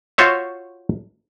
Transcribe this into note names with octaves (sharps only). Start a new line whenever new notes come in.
F4 F#4 C5 C#5 E5